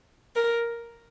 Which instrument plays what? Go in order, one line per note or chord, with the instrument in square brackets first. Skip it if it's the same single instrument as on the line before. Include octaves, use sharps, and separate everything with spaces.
[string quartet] A#4